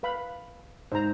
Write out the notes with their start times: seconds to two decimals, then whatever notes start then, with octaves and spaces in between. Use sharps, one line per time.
0.03 B4 F5 B5
0.92 G#2 C5 A#5